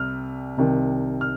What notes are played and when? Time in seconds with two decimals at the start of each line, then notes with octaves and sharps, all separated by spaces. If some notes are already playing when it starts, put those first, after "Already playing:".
Already playing: C2 C3 F6
0.57 C2 C3 D#3
1.21 F6